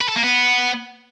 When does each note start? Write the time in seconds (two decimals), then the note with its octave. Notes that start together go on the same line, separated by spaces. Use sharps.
0.01 B4
0.08 A4
0.16 A#3
0.23 B3